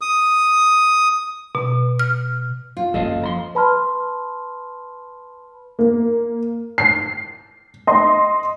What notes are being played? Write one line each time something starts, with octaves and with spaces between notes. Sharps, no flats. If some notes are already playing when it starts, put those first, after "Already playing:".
D#6
B2
F6
F4
F#1 A4 D#5 F5
F3 A#5 C6
B4 A5 B5 C6 F6
A#3
C7
D#5 C6